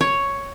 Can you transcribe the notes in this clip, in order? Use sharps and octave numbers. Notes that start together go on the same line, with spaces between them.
C#5